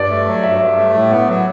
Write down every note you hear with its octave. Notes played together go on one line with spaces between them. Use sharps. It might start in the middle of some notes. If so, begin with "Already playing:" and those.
Already playing: G2 D5
A3
F#3
G2 E5
G2
A3
A2
B3
F#3